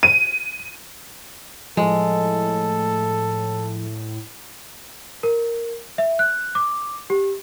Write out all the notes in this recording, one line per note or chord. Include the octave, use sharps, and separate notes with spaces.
D#7
A2 F3 G#3 A4
A#4
E5
F#6
D6
G4